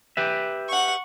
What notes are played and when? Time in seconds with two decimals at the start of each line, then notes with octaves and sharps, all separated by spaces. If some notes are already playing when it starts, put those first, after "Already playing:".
0.17 G4 B4 E5
0.69 F#5 C#6